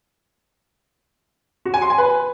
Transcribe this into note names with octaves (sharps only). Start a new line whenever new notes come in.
F#4
G#5
C6
G#5
B4